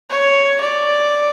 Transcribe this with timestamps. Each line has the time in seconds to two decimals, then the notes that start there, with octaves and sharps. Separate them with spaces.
0.10 C#5
0.61 D5